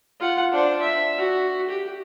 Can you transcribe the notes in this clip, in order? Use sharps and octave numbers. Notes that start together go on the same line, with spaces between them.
F4 F#5
D4 C5
E5
F#4
G4